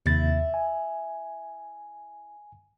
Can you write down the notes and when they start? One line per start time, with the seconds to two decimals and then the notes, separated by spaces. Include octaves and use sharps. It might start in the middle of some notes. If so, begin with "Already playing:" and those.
0.06 D#2 C3 E4 A6
0.54 G#5